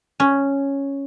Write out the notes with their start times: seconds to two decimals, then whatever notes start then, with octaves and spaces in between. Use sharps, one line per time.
0.20 C#4